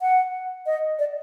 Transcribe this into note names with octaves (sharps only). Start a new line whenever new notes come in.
F#5
D#5
D5